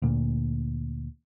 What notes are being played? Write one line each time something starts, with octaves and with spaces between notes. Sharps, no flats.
D2 A#2